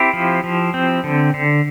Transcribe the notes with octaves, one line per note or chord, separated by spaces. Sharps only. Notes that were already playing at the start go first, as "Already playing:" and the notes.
Already playing: C4 E4 G4
F3
F3
C4
D3
D3